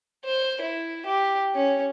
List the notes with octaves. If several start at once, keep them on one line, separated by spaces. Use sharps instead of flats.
C5
E4
G4
C#4